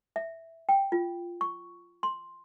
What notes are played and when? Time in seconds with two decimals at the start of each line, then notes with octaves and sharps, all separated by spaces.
0.16 E5
0.69 G5
0.92 F4
1.41 C#6
2.03 C6